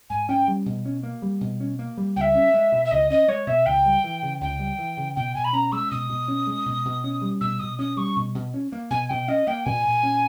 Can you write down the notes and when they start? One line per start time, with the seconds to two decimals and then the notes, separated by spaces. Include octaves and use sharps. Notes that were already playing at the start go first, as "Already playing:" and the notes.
0.10 G#2 G#5
0.29 C#4 G5
0.48 G3
0.66 B2
0.86 C#4
1.03 A#3
1.22 G3
1.41 B2
1.60 C#4
1.79 A#3
1.97 G3
2.16 C#2 G5
2.21 E5
2.35 C#4
2.54 G#3
2.72 B2
2.85 E5
2.91 C#2 D#5
3.10 C#4 D#5
3.28 G#3 C#5
3.47 B2 E5
3.66 C#2 G5
3.85 G3
4.04 E3
4.23 C#3
4.41 C#2 G5
4.60 G3
4.79 E3
4.97 C#3
5.16 B2 G5
5.35 B2 G#5
5.44 B5
5.53 C#4 A#5
5.72 G#3 E6
5.91 B2 D#6
6.09 B2
6.28 C#4
6.47 G#3
6.66 B2
6.85 B2
7.04 C#4
7.22 G3
7.41 B2 E6
7.59 B2 D#6
7.79 C#4 D#6
7.97 G3 C#6
8.16 B2
8.35 B2
8.54 C#4
8.72 A#3
8.90 B2 G#5
9.09 B2 G5
9.28 C#4 D#5
9.47 A#3 G5
9.65 A#2 G#5
9.85 A#2
10.03 C#4